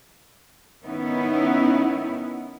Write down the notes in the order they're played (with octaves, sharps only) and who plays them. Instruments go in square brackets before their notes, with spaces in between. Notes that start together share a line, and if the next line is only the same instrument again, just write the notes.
[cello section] D#3 B3 C#4 D#4 E4